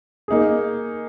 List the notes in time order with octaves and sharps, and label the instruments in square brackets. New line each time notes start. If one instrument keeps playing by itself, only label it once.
[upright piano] A#3 D#4 G#4